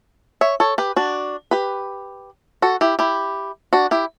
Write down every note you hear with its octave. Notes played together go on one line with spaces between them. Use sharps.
C#5 E5
A4 C#5
G4 B4
D4 F#4
G4 B4
F#4 A4
E4 G4
E4 G4
D4 F#4
E4 G4